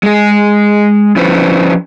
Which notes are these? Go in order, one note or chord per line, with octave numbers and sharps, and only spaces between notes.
G#3 G#4
F3 C#4 D4 E4 B4 C5